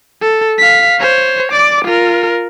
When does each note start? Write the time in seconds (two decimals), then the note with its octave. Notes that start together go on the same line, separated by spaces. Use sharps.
0.22 A4
0.58 F5 B6
1.00 C5 C#5
1.52 D5 D6
1.85 F4 A#4